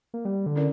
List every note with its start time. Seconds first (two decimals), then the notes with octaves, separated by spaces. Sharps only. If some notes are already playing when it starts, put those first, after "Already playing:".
0.14 A#3
0.25 G3 A#3
0.46 D3
0.56 C#4 E4 A#4 D5